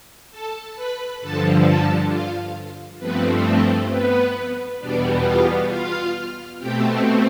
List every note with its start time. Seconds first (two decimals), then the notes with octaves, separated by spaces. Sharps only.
0.31 A4 A5
0.76 B4 B5
1.21 G2 D3 F3 A4 A5
1.65 A4 A5
2.10 F4 F5
3.00 G2 F3 A3 B3 C4 B4
3.45 A4
3.89 B3 B4
4.80 E2 B2 G3 B3 D4 D5
5.24 F4 F5
5.69 F4 F5
6.59 B2 A3 C4 G4 G5